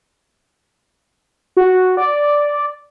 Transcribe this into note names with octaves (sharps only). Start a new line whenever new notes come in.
F#4
D5